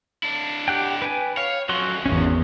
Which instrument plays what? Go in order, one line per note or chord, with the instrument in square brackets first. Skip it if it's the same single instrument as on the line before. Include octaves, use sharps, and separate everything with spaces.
[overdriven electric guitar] D4 E4
[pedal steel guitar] G4 F#5 G5
B4 G5 G#5
[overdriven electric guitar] C#5 [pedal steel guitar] F5
[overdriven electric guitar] F#2 F3 [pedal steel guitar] F#3 F#4 C6
[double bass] G#1 E2 [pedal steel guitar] C#4 F#4